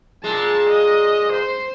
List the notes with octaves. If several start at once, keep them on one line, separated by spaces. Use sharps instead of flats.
A#2 G#3 A5
D#5
C5